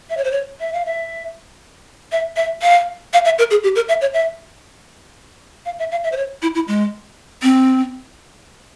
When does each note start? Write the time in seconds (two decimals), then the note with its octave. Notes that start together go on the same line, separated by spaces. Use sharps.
0.10 E5
0.17 C#5
0.24 C5
0.32 C#5
0.60 E5
0.73 F5
0.85 E5
2.12 E5
2.36 E5
2.62 F5
3.13 F5
3.25 E5
3.38 A#4
3.51 G#4
3.63 G4
3.75 A#4
3.88 E5
4.01 C#5
4.14 E5
5.65 F5
5.79 E5
5.91 F5
6.04 E5
6.12 C5
6.17 C#5
6.42 E4
6.55 E4
6.68 G#3
7.42 C4